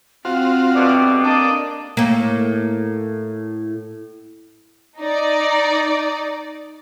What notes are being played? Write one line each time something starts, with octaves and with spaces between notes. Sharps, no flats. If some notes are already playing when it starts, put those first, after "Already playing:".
C4 F4 F#4 C5
G2 B2 A3 D5
A#3 D4 D#5 A5
A2 A#3
D#4 D5